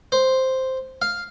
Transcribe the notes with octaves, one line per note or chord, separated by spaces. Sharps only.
C5
F5